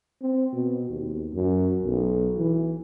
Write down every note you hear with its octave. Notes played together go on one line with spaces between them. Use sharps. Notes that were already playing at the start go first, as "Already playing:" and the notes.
C4
B2
D#2
F#2
B1
E3